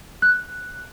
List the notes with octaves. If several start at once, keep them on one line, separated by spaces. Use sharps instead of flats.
F#6